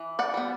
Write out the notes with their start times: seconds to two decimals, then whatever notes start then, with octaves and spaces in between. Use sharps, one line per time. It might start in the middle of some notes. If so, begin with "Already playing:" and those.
Already playing: E3
0.19 D5 F#5
0.34 G3 B3